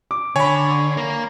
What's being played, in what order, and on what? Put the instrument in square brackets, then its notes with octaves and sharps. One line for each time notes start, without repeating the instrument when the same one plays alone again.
[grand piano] D6
[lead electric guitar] D3 [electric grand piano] C#5 [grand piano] G#5 B5
[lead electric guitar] A#3 A#4